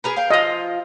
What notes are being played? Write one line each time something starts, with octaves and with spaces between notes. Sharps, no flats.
G#4 A#4 B4
F5 G5
F3 F4 D#5